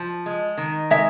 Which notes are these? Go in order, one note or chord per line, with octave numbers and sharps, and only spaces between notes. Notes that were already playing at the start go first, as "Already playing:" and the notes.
Already playing: F3
G#3
D#3
G#3 E5